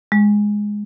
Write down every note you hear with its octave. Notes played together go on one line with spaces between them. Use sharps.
G#3